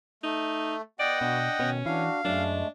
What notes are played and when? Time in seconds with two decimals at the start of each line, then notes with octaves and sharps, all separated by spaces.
0.23 A3 D#4
0.99 B3 F#4 D5 D#5 F#5 G5
1.21 B2 D4
1.59 B2 D#3 C#4
1.86 E3 D4 F#4 F5
2.25 F#2 G#3 A3 D4